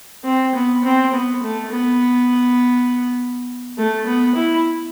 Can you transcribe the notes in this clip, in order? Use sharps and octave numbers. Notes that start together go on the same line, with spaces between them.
C4
B3
C4
B3
A3
B3
A3
B3
E4